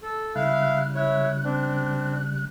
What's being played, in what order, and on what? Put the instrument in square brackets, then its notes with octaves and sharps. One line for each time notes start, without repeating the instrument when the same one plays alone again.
[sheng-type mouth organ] A4
[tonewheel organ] C#3 G3 F#6 [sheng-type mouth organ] E4 F5
[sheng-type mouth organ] E4 C#5
C4 D4